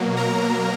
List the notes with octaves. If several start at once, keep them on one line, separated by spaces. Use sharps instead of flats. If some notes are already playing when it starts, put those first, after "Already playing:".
Already playing: B2 F#3 A#3
A#4 A#5